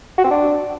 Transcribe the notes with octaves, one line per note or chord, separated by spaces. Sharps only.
F#4
C4
D4